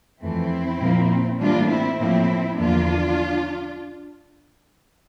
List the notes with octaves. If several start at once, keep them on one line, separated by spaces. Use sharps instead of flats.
F2 E3 A3 C4 E4
A#2 F3 A#3
A2 E3 G3 A#3 D4 F4
C4 E4
A2 F3 A#3 C4 E4
E2 D3 F3 A#3 D4 F4